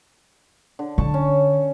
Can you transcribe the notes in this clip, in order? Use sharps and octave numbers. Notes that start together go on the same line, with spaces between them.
D3
D3 A5 C#6
C#4